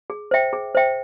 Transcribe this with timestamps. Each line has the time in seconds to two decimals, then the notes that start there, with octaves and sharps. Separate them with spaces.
0.10 G#4
0.31 C5 E5 G5
0.53 G#4
0.75 C5 E5 G5